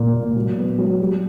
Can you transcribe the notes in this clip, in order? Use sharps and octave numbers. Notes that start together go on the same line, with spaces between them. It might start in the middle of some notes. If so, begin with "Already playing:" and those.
Already playing: A#2 A#3
A#2
F#3
B3
F#3
G3